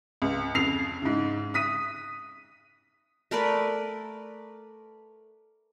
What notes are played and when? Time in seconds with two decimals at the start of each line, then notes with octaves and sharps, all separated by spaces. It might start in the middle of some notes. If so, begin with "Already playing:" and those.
0.22 C#2
0.55 F2 C#3 C7 F7
1.02 G#2 C#3
1.54 D#6 B6 D#7
3.31 A3 A#4 B4 D5